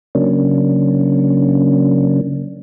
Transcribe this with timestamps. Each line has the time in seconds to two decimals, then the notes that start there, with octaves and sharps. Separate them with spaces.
0.15 C#3 F#3 A#3 C#4 D4